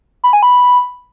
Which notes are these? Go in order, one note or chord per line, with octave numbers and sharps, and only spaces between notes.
B5
G#5
B5